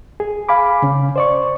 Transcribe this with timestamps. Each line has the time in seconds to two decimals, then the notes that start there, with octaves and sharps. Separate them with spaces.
0.20 G#4
0.49 F5 G#5 B5 D6
0.82 C#3 C#4
1.16 C5 D5 C#6